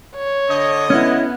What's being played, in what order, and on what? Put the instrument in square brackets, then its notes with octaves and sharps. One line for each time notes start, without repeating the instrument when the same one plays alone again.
[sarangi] C#5
[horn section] D3 D#5
[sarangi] B3 [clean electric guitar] C#4 E4